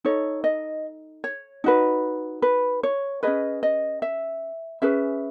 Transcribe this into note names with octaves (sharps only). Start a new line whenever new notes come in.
D#4 A4 C#5
D#5
C#5
D#4 F#4 B4
B4
C#5
C#4 G#4 B4 D#5
D#5
E5
C#4 G#4 B4 E5